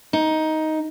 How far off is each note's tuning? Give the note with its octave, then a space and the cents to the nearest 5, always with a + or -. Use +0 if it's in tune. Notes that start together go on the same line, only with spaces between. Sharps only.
D#4 +10